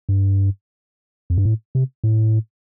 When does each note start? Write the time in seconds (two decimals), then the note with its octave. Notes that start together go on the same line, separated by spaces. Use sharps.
0.09 G2
1.30 F2
1.38 G2
1.45 A2
1.75 C3
2.04 A2